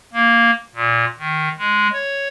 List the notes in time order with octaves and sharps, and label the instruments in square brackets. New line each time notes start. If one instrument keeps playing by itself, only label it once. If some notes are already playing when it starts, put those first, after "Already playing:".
[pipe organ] A#3
A#2
D#3
G#3
C#5